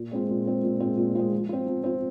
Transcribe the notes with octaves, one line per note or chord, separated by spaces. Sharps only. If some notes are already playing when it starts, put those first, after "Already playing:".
Already playing: A#2
G#3 C4 F4
A#2
G#3 C4 F4
A#2
G#3 C4 F4
A#2
G#3 C4 F4
F3
C4 F4
F3
C4 F4